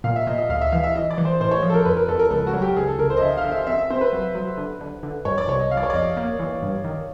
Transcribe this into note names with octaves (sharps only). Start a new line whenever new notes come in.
A#2 F5
E5
A#2 D#5
D#5
D2 F5
E5
E3 F5
E5
E3 D#5
D5
E3
C5
A2 C5
C#5
F3
A4
A#4
F2 B4
A#4
F2 A4
A#4
C#2 A4
F#4
F#3
G4
C#2 G#4
A4
C#2 A#4
C5
D#5
D3 E5
F5
D3
E5
C4 E5
E5
C4 C5
B4
F#3
F#3
D3
D3
D3
G2 C#5
D5
C2 C#5
D#5
C2 F5
D5
C#5
D5
F2 D#5
A#3
E3
G2
D#3